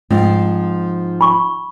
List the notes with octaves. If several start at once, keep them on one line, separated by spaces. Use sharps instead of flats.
G#2 F3 C4
B5 C#6